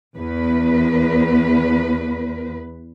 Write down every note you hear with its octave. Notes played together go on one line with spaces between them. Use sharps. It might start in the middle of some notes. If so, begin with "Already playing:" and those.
E2 B4